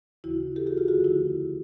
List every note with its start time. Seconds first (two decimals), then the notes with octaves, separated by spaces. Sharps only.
0.24 D#2 C#3 E3 E4 F#4
0.56 G4 A4
0.67 F#4 G#4
0.78 F4 G4
0.88 F2 D3 F3 A3 F#4 G#4
1.04 E4 F#4